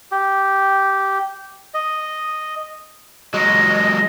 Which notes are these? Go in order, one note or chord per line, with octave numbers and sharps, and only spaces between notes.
G4
D#5
F#3 G#3 D#5